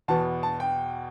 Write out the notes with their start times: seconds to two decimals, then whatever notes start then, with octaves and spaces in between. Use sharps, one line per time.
0.08 E2 B2 B3 A5
0.43 A5
0.60 G5